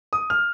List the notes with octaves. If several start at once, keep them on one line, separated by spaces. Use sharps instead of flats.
D#6
F6